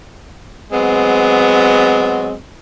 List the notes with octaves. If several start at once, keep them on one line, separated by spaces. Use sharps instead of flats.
F#3 G#3 B3 C4